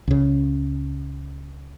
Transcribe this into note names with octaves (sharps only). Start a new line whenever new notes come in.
C#2 C#3